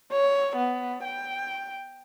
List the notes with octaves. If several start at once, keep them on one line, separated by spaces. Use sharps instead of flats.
C#5
B3
G5